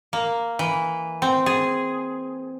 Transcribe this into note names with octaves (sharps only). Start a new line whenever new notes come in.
A#3
E3
C4
G#4